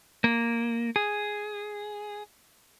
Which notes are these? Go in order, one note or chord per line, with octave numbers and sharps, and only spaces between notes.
A#3
G#4